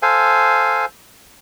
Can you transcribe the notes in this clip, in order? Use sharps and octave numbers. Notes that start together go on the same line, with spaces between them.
A4 C5 F5 G#5